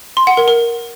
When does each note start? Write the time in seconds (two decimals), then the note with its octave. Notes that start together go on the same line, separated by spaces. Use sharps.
0.17 C6
0.27 F#5
0.37 A#4
0.48 A#4